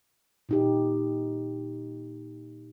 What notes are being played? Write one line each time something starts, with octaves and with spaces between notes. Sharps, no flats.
A#2 D#4 G4